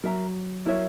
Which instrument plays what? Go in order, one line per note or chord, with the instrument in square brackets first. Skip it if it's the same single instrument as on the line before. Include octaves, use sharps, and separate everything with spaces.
[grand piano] F#3 [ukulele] A#4 E5 A#5
[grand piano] F#3 [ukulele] E4 A#4 C#5 E5